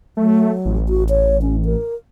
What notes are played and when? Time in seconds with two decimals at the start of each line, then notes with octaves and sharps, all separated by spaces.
0.17 F#3 A3
0.65 A1
0.89 F#4
1.09 C#5
1.42 C#4
1.65 A#4